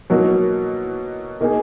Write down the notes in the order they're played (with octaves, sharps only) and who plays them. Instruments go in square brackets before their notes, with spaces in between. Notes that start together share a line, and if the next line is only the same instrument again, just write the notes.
[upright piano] B2 F#3 A#3 D#4 F#4
B2 A#3 D#4 G#4